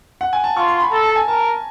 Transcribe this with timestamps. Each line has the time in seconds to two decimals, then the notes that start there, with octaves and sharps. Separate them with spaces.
0.21 F#5
0.33 G#5
0.44 A5
0.57 F4 C#6
0.68 C6
0.80 B5
0.91 A4 A#5
1.03 A5
1.16 G#5
1.28 A#4 A5